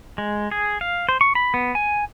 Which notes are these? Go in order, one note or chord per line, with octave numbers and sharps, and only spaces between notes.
G#3
G#4
F5
C5
C#6
B5
B3
G#5